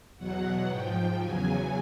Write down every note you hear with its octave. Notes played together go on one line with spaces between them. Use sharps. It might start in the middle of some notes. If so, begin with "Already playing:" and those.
E2 B2 F#3 F#5
G#2 F3 G5
E2 C#3 F#3 G#5